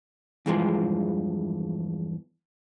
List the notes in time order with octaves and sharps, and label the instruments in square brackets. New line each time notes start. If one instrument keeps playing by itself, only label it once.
[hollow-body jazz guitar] E2 G2 E3 F3 G#3